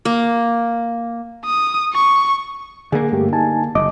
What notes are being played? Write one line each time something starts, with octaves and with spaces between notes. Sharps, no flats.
A#3
D#6
C#6
D3 A#3 G#4
G2 A3 G4
D#4 G#5 A5
F#1 D#5 D6